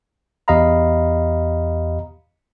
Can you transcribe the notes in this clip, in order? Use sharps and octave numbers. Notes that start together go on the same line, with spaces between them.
E2 G4 D#5 F5 A#5 B5